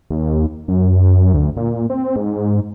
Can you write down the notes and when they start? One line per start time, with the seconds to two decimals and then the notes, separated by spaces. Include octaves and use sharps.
0.10 D#2
0.68 F#2
1.34 D2
1.57 A#2
1.90 C4
2.16 G#2